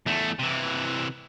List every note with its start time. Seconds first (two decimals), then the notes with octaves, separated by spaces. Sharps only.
0.06 E2 A3
0.39 C3 E3